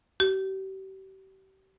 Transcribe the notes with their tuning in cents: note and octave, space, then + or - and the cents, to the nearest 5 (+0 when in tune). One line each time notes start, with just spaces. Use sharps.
G4 -40